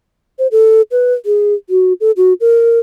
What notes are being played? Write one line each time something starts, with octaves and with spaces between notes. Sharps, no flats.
C5
A4
B4
G#4
F#4
A4
F#4
A#4